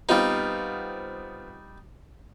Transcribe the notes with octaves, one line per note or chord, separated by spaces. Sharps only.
G3 B3 C4 D#4 F4